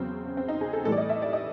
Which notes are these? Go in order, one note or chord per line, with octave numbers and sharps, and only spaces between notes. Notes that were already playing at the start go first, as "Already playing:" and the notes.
Already playing: E2 C#3 F#3 C4
C4
D#4
G#4
A4
A2 E3 G3 A4
D5
D#5
E5
D5
D#5